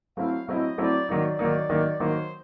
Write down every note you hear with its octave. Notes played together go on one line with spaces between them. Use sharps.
F#3 A3 C4 E4 F5
F#3 A3 C4 E4 D#5
F#3 A3 C4 E4 D5
D#3 F#3 A#3 D#4 D5
D#3 F#3 A#3 D#4
D#3 F#3 A#3 D#4
D#3 F#3 A#3 D#4 C5